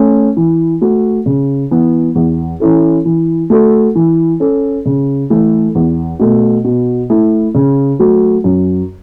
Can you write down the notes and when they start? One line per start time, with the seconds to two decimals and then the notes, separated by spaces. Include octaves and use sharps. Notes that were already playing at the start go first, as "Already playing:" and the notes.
Already playing: A3 C#4
0.37 E3
0.81 A3 F#4
1.26 C#3
1.71 E3 B3
2.15 E2
2.60 E3 C#4 E4 A4
3.05 E3
3.50 A3 F#4 A4
3.95 E3
4.40 C#4 A4
4.86 C#3
5.30 E3 A3 E4 A4
5.75 E2
6.19 B2 A3
6.64 B2
7.10 A3 E4
7.55 C#3
7.99 F#3 A3 F#4
8.44 F#2